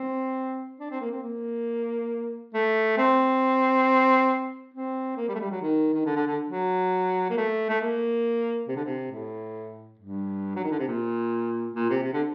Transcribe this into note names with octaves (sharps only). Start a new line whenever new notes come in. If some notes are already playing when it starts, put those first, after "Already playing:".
Already playing: C4
D4
C4
A#3
C4
A#3
A3
C4
C4
A#3
G3
A3
G3
F#3
D#3
D#3
D3
D3
D3
F#3
A#3
A3
A3
A#3
C3
D3
C3
A2
G2
F#3
D#3
D3
C3
A#2
A#2
C3
C3
D3